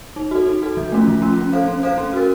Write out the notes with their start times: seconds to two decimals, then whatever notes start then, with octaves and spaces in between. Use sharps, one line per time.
0.16 D#4
0.31 F#4 A4
0.47 D#4
0.62 F#4 A4
0.77 F3
0.92 A3 C#4 F4
1.08 F3
1.22 A3 C#4 F4
1.38 C#4
1.53 A4 C5 F5
1.68 C#4
1.83 A4 C5 F5
1.98 C#4
2.13 F#4 A#4